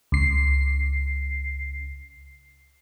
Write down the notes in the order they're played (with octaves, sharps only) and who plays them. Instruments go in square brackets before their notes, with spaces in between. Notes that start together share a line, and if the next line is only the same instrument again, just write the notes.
[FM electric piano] C#2 C7